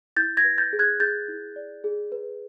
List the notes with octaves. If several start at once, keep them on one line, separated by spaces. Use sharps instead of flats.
E4 G6 A6
G#6 A#6
B4
G6 A6
G#4
F#6 G#6
G#4 G6 A6
E4
D5
G#4
B4